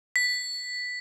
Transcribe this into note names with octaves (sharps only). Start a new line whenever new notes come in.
B6